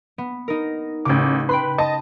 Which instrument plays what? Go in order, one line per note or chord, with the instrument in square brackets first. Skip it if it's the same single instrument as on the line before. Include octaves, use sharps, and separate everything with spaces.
[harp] B3
D#4 A#4
[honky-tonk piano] A1 D6 [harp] C#3 G4
[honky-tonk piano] B4 [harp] G5 B5 C6
[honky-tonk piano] D#5 A5